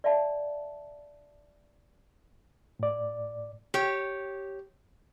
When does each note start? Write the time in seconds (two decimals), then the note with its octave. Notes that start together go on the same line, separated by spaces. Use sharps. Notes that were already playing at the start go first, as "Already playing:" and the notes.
0.04 D5 E5 F5 A5 B5
2.79 A2 D5
3.74 G4 C#5